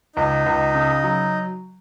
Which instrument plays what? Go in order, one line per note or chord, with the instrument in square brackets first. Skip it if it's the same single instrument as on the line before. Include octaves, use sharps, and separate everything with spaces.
[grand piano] C#2 [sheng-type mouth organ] D#4
[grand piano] C#2
C#3
F#3